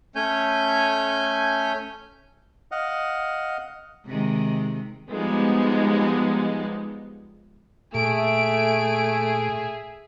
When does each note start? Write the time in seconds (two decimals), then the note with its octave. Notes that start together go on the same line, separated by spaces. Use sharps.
0.15 A3 C#4 C#5 G#5 G6
2.71 D#5 F5 F#5
4.06 C3 D#3 G#3
5.10 F3 G3 G#3 B3 D#4
7.95 A#2 A3 G#4 E5 D7